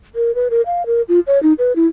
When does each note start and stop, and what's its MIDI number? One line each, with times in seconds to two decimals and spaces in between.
0.15 0.34 70
0.35 0.48 71
0.50 0.61 70
0.66 0.86 77
0.86 1.02 70
1.08 1.20 65
1.27 1.41 73
1.43 1.53 63
1.59 1.75 71
1.76 1.87 64